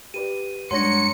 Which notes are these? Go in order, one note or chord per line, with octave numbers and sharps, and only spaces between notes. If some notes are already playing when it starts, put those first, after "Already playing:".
G4 B4 D5 D#7
G2 F#3 G#3 D4 C6 A#6 C#7